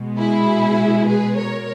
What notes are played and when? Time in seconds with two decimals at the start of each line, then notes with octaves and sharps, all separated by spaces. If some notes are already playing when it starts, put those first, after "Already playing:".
Already playing: B2 G#3
0.17 E4 G#4
1.08 G#4 B4
1.38 A#4 C#5